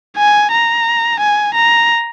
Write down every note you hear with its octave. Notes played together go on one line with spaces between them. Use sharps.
G#5
A#5
G#5
A#5